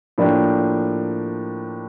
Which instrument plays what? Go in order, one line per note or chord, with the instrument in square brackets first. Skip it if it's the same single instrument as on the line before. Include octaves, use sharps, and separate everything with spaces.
[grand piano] A2 F3 A#3 D4 G4